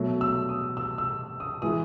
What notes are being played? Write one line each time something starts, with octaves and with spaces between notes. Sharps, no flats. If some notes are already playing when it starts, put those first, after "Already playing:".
Already playing: B2 F#3 A3
E6
D#6
E6
E6
D#6
E3 G#3 D#6